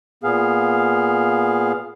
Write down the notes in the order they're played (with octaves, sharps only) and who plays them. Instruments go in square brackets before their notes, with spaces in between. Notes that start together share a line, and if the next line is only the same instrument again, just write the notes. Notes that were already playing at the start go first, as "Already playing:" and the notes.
[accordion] A#2 B3 G#4 F5